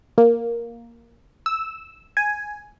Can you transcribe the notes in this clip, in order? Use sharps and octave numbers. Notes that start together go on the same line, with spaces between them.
A#3
E6
G#5